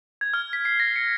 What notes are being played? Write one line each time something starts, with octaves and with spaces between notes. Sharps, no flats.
G#6
F6
B6
C7
A#6
C#7